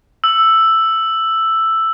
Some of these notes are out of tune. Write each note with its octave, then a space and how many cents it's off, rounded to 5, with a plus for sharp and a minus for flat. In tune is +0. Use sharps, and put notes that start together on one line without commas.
E6 +5